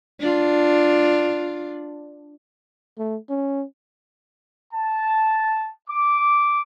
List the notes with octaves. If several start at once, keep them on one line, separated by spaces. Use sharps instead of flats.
D4 F4
A3
C#4
A5
D6